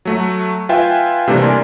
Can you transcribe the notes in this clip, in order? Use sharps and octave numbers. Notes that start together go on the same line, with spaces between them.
F#3 A3 F#4
F4 B4 E5 G5 G#5
C3 E3 G3 A3 A#3 D4
A#4 D5 G#5 C6